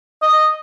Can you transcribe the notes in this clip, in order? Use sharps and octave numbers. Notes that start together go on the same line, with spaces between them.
D#5